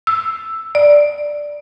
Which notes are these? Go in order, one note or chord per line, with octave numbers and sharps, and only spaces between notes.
E6
D5